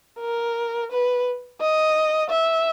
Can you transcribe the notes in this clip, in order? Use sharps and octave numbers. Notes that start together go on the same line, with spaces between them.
A#4
B4
D#5
E5